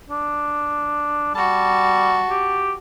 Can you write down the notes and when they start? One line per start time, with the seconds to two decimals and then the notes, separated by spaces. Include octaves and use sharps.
0.10 D4
1.35 G3 F#4 A5
2.30 G4